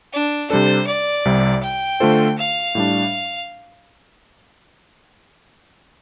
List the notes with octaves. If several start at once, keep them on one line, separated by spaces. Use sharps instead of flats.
D4
C3 G3 D4 A4 C5
D5
C2 C3 G3
G5
D3 A3 F4 A4 C5
F5
A2 G3 D4